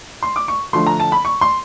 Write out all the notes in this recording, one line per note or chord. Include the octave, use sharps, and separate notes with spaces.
C6
D6
C#6
D3 F3 A3 C6
A#5
A5
B5
C#6
C6